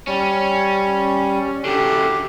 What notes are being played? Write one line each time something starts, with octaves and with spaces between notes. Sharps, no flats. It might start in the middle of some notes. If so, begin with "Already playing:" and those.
G3 C#4
F#2 D3 G4